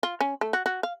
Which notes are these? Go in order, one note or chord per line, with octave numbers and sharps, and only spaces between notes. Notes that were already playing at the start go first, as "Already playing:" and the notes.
F4
C#4
A3
F#4
F#4
F5